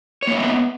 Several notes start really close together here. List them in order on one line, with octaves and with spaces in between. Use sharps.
C#5 A#3 E5 D#5 B3